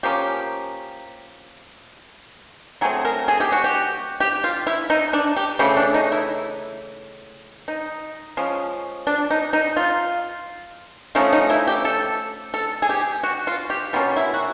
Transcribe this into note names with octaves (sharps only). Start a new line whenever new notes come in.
F3 A#3 C#4 G4
F#3 A3 C4 G#4
A#4
G#4
G4
F#4
G4
G4
F4
E4
D#4
D4
G4
C#3 E3 A3 G4
D4
D#4
E4
D#4
F3 G#3 C#4
D4
D#4
D#4
F4
F3 A3 C#4 D#4
D#4
E4
G4
A4
A4
G#4
G4
F#4
F4
G4
B2 G3 A#3 C#4 F4
E4
F#4